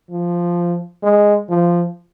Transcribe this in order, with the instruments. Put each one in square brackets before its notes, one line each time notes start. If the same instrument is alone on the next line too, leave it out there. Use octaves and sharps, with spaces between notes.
[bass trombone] F3
G#3
F3